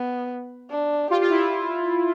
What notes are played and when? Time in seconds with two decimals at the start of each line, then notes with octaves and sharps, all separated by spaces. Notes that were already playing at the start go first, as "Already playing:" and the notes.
Already playing: B3
0.70 D4
1.10 F4 G4
1.21 F4
1.30 E4